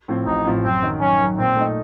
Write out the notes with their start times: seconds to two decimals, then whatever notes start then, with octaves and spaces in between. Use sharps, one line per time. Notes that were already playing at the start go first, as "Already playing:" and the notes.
0.08 A2 F3 C4
0.26 A1 D#4
0.44 A2 F3 C4
0.64 F#2 C4
0.82 D#3 F#3
1.00 F#2 C#4
1.19 D#3 F#3
1.38 A#2 C4
1.56 A3 D#4